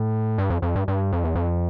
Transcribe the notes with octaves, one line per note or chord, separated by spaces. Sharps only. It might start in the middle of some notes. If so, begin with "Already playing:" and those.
Already playing: A2
G2
F2
F2
G2
G2
F2
E2
F2